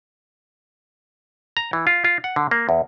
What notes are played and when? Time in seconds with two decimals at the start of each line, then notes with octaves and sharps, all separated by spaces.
1.57 A#5
1.73 E3
1.87 F4
2.05 F4
2.24 F#5
2.36 D3
2.51 A#3
2.69 E2